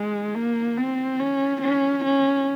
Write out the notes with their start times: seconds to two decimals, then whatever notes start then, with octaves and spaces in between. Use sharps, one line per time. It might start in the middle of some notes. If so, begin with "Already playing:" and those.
Already playing: G#3
0.35 A#3
0.78 C4
1.20 C#4
1.62 C#4
2.05 C#4